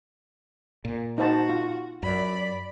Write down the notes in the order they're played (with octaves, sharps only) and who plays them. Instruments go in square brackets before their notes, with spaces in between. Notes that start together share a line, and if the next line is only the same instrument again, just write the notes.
[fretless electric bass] A#2
[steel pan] D#4 C5 A5 [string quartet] F#4
[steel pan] F4
[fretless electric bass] F#2 [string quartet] D5 B5